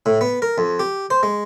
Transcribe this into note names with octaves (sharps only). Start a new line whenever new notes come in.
A2
B3
A#4
F2
G4
C5
G#3